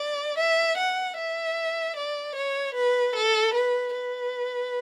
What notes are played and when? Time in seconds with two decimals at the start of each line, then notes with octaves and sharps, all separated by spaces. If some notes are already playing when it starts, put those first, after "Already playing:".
Already playing: D5
0.38 E5
0.78 F#5
1.17 E5
1.96 D5
2.35 C#5
2.75 B4
3.16 A4
3.54 B4
3.94 B4